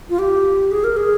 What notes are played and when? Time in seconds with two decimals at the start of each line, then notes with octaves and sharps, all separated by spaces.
0.10 F4
0.19 G4
0.71 G#4
0.84 A#4
0.97 G#4